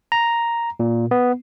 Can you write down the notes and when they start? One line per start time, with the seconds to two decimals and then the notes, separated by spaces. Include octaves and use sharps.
0.12 A#5
0.80 A#2
1.11 B3